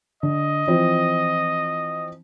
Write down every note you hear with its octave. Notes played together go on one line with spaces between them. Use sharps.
D3 D#5
E3 F3 C4